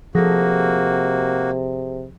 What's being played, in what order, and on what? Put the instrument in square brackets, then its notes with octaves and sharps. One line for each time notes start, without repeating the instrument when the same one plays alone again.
[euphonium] C3 [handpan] F3 A4 [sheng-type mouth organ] A#3 F#4 [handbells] G#4 A#6